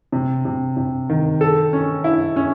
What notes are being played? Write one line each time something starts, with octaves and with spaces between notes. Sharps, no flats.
C3
C3
C3
D#3
A4
C#4
E4
C#4